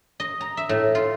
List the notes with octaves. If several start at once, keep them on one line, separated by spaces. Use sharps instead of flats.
D#5
A#5
E5
A2
F4